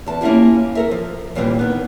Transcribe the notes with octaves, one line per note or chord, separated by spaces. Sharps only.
E2 A5
A#3 C#4 E4 F4 G4
A4 A#4 E5
F3
D#2 A#2 E3 G3 C4
D#3 B3